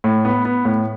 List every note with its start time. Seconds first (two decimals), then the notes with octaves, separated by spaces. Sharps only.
0.04 A2
0.25 B3
0.45 B3
0.65 A2